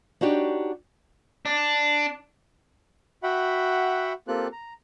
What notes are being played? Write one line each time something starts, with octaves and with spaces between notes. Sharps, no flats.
D4 D#4 F#4 G4 C#5
D4
F#4 E5 F#5 G5 B5
A#3 C4 F4 G4 A4 F#6
A#5